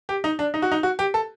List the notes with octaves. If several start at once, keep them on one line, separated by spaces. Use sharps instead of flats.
G4
D#4
D4
D#4
F#4
D#4
F#4
G4
A4